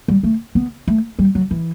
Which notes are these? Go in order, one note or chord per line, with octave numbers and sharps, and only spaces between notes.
G3
A3
B3
A3
G3
F#3
E3